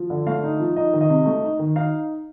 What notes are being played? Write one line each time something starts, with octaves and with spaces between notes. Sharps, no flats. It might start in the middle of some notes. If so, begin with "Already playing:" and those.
Already playing: F3
D3
A3 F5
D#4
F3
D#4 D#5
D#3
D#5
C3
A3
D#4
D#3
D#4 F5